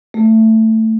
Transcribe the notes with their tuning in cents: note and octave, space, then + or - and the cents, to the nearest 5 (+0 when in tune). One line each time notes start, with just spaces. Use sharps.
A3 +10